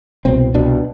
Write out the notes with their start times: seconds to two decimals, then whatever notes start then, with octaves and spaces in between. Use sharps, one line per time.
0.25 C2 B2 C4
0.54 C2 B2 D4